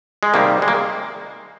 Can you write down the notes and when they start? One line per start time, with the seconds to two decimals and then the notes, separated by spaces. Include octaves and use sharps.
0.23 G#3
0.34 C3 D#3 G3 A#3
0.62 G#3
0.68 A#3